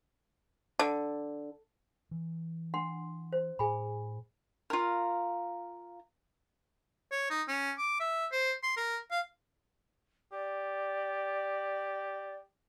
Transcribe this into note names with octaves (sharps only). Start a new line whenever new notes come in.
D3
E3
D4 F#5 C6
C5
A2 G#4 G#5 B5
F4 A#4
C#5
D#4
C#4
D6
E5
C5
C6
A#4
F5
G4 D5